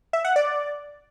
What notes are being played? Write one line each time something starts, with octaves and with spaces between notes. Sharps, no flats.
E5
F#5
D5